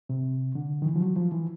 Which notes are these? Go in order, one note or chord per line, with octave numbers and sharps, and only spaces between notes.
C3
D3
D#3
E3
F3
F#3
F3
E3